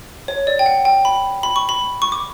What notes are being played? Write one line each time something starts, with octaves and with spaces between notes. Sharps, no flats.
C#5
D5
G5
F#5
G5
B5
B5
C#6
B5
C#6
D6